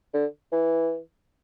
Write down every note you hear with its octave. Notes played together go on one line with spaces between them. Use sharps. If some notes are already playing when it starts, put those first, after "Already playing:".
D3
E3